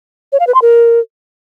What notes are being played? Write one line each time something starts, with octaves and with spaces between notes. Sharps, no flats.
C#5
F5
B4
C6
A#4